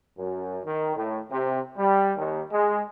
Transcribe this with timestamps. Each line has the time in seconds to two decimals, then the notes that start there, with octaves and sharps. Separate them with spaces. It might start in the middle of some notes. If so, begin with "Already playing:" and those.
0.18 F#2
0.65 D#3
0.96 A2
1.30 C3
1.77 G3
2.16 D#2
2.51 G#3